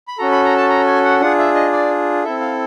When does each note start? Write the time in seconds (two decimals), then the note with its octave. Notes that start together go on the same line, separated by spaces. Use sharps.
0.08 B5
0.18 C#4 F#4 A4 A#5
0.32 B5
0.45 A#5
0.57 A5
0.69 A#5
0.87 G#5
1.04 F#5
1.21 D4 F4 G#4 F#5
1.39 E5
1.55 D#5
1.72 D5
2.24 C4 E4 A4 E5
2.41 F5